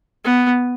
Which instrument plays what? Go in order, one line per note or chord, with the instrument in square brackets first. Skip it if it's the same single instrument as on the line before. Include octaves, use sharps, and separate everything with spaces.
[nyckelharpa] B3